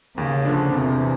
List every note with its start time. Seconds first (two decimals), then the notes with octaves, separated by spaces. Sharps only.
0.17 D#2 C#3
0.45 D3 F3 A#3 D4
0.73 E2 C3
1.01 E3